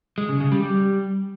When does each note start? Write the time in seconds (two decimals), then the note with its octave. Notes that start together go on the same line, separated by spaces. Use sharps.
0.18 G#3
0.29 C#3
0.40 C#3
0.52 G3
0.63 G3